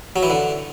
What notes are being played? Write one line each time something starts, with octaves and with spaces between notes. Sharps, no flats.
F#3
E3
D3